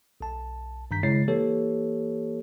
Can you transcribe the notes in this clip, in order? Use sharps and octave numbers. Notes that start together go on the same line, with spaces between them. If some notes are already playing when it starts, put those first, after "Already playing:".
B1 A5
G2 D#3 A#5 G6 B6
C#3 G#3 E4 C#5 A6 C7
E3 A#3 G4 A4 C#5